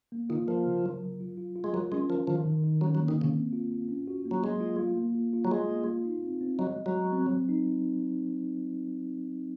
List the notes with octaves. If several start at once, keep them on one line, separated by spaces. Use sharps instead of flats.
A#3
D#3 F4
F3 A#4
C#3
F#3
F#3
F4
F4
F4
G#3
F#3 A#4
G#3 C#4
F3 A#4
D#3 F3
D#3
D#3
F#3 C#4
F#3
A#3
D#3
C#3 A#3
C4
F4
F4
C#4
F#4
A#3
F#3
F#3 G#3
F4
F4
A#3
F4
F4
F#3
G#3 F4
A#3
F4
D#4
C4
C4
F#3 D#5
G#3
F#3
G#3
C4
F#3
D#4